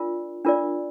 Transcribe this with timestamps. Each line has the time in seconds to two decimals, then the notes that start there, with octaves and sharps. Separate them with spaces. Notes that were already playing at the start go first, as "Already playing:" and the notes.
Already playing: D4 F4 A#4 D5
0.45 D4 F4 A#4 D5